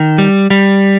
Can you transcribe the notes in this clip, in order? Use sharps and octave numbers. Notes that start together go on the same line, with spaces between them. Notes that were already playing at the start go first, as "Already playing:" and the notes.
Already playing: D#3
G3
G3